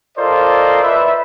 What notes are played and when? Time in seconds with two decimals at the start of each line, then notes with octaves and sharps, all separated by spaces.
0.17 F4 A4 A#4 C5 D5 D#5
0.83 B4 E5